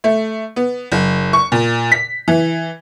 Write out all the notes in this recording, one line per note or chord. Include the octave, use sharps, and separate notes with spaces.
A3
B3
F#1
C#6
A#2
B6
E3